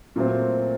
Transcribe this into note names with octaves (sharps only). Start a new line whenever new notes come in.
A#2 F#3 A3 C4